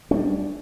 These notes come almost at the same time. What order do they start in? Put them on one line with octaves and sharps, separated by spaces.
C#4 A3 G3 D4